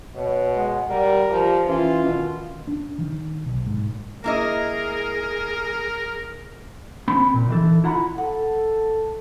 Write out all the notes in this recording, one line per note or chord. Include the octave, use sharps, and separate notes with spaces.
B2 C#5
G#3 F#5
G3 A#4
F3 G4
E3 C#4 F4
B2 D#3
D4
D#3
B1
G#2
A#3 E4 G#4 A#4 D#5
C4 B5
A#2
D#3 E3 A4
E4 F4 F#5 A#5 B5
A4 F#5